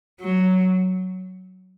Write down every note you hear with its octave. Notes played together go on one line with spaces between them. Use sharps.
F#3